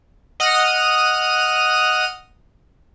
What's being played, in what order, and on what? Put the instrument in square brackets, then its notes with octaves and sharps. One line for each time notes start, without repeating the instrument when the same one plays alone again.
[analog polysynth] D#5 F#5 D#6 F6 D#7